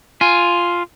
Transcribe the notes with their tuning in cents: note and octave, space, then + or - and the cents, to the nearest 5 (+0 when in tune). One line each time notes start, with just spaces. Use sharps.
F4 +0 G#5 +0